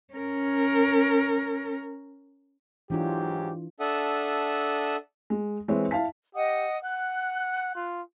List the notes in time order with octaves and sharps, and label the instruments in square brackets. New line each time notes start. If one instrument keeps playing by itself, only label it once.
[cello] C#4 A#4
[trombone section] G#2 F#3 G4 [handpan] E3 D4 F4
[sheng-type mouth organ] D4 A4 E5 F#5 D#6
[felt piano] G#3
E3 G#3 C4 B4 C#5 E5
E4 E5 F5 A5 B6
[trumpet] G4 [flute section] D#5 F#5 D#6
[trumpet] F#5 [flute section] F#6
[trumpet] F4